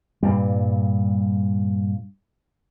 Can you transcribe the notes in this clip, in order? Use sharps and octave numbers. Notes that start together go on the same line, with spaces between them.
G2 A#2 G3